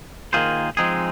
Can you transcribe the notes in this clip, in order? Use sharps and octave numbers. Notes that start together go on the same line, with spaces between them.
D#3 A#3 F4 G#4 C5
F3 G#3 C4 D#4 G#4